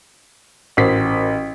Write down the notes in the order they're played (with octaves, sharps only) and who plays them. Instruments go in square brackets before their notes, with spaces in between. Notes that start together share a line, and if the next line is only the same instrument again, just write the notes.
[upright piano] A1 B6 [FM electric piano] F#4 A#4 C5